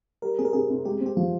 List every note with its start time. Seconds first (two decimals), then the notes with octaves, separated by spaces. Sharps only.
0.22 G3 A#4
0.39 C4 G#4
0.45 A#4
0.53 C3 G#4
0.70 C3
0.85 G#3 G4
1.01 C4
1.06 G4
1.17 F3 F4